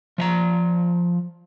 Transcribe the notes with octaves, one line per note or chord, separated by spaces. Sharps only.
F3 E5 A#5